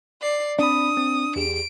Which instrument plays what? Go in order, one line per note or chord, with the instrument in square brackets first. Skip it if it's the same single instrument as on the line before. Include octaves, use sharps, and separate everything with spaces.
[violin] D5 C7
[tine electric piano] C4 B5 [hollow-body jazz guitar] D4 [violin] D#6
[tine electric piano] C4
[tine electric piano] E2 G4 G#4 [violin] D7